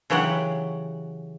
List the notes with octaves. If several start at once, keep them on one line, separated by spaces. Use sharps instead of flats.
C#3 E3 F#3 G4 F#5